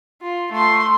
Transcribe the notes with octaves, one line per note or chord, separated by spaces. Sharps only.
F4
A3 C6